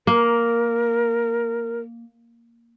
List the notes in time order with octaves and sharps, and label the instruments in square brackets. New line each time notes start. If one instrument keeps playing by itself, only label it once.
[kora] A#3 [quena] A#4